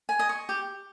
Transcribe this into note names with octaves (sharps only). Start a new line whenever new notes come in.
G#5
D#5
C#6
G4